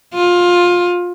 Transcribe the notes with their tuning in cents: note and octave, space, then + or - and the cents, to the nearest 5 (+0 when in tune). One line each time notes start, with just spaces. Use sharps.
F4 +20